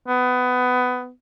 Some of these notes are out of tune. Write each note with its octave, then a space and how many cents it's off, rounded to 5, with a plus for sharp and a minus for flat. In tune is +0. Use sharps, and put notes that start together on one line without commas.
B3 +20